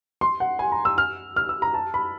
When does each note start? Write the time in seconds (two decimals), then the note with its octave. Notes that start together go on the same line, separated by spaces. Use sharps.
0.21 C6
0.40 F#5
0.59 G#5
0.72 A#5
0.85 E6
0.98 F6
1.36 F6
1.49 E6
1.62 A#5
1.74 A5
1.94 B5